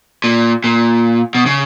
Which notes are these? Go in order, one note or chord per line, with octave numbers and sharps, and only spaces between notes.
A#2
A#2
B2
C#3